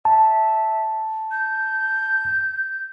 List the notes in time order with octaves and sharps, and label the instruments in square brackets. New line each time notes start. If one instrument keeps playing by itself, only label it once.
[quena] E5 [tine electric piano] A5
[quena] G6